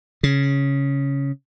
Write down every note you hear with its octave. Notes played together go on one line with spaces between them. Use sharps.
C#3